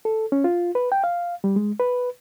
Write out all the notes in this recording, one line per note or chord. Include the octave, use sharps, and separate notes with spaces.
A4
C#4
F4
B4
G5
F5
G3
G#3
B4